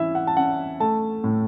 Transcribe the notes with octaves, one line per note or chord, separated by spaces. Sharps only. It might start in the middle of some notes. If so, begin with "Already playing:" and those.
Already playing: E3 C#4 E4 E5
F#5
A5
C#4 F#5
A3 A5
A2